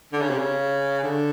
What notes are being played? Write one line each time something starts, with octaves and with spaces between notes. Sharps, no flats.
D3
C#3
C3
C#3
D3